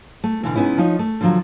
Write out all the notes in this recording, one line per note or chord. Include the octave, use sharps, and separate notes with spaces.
A3
B2 D3 E3
C3 G#3 B3 C#4 D#4 E4
F3 D#4 C#5
A3
D3 F3 F#3